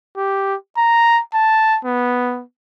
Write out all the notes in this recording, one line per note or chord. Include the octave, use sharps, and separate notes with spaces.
G4
A#5
A5
B3